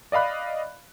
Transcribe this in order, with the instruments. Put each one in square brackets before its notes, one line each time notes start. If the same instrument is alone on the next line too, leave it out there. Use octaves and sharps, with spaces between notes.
[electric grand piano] D5 D#5 F5 B5 F#6